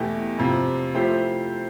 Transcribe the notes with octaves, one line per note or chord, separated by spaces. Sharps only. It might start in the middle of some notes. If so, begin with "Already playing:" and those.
Already playing: E2 B2 A3 E4 G4
F2 C3 F3
F3 A3 E4 G4 C5